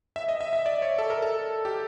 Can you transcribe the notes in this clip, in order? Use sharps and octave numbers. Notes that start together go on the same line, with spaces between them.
E5
D#5
E5
E5
D5
C#5
A4
A#4
A4
G4